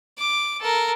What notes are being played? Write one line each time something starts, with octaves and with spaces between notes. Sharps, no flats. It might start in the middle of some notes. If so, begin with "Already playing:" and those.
D6
A4 A#4